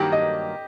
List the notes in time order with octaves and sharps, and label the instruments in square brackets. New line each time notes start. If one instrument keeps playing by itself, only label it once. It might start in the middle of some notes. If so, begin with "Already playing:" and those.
Already playing: [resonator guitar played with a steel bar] G2 D#3 F#3 A#3 [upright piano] G4
[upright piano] D#5